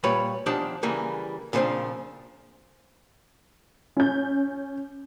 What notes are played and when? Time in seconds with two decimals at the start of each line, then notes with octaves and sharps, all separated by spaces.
0.04 A#2 G3 B4 C#5 B5
0.46 E2 D#3 F3 D4 G4 A5
0.83 C#3 E3 G3 A#3
1.53 A#2 C#3 F3 A3 C4 D4
3.97 C#4 G6